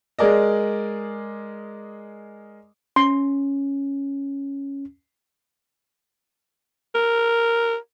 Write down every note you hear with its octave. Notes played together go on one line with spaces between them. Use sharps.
G#3 G#4 A#4 D5 D#5
C#4 C6
A#4